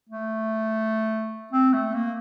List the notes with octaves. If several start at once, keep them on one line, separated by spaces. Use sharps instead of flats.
A3
C4
A3
A#3